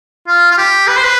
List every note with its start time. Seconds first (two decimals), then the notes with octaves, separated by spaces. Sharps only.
0.27 F4
0.51 F4
0.58 G4
0.88 B4
0.97 C5
1.04 B4